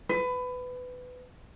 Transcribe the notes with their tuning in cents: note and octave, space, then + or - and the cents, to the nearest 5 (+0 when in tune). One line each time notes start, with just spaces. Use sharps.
B4 +20